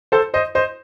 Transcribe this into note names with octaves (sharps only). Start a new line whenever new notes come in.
A4 C5
C5 D#5
C5 D#5